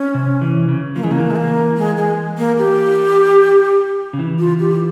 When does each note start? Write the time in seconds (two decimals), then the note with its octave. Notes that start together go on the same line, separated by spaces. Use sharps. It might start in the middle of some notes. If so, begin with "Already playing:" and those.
Already playing: C#4
0.14 C3
0.41 E3
0.69 C#3
0.96 F3 A#3
1.04 E3 G#3
1.11 C#3 A#3
1.19 E3
1.31 G#3
1.36 A#3
1.77 G#3
1.97 G#3
2.38 A#3
2.58 G4
4.13 C#3
4.19 E3
4.39 F4
4.59 G4